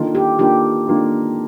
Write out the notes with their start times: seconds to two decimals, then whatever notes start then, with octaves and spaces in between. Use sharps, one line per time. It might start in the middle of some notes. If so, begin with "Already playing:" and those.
Already playing: D#3 A#3 D4 F4 A4
0.15 G4
0.39 D#3 A#3 D4 F4 G4 A4
0.87 D#3 A#3 D4 F4 A4